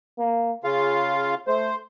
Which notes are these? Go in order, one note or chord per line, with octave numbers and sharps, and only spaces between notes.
A#3
C#3 F4 G#4 F5
A3 C5